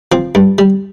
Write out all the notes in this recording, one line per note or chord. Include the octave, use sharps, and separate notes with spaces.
F3 C4
G2
G3